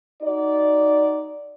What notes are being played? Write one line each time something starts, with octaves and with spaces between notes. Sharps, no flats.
D#4 F#4 D5